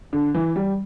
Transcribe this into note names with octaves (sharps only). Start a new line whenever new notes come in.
D3
E3
G3